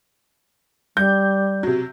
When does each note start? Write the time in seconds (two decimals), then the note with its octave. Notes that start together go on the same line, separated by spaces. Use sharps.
0.97 G3 G6
1.63 C3 F#3